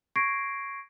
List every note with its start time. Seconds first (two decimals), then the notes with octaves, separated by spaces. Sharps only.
0.16 C#6 G#6 A#6 C7 D7